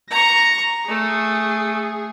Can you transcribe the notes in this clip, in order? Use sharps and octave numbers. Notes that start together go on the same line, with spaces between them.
A#5 C#6 A#6
A3 G#4